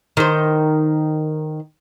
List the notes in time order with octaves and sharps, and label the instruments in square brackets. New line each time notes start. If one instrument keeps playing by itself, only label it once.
[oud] D#3 C5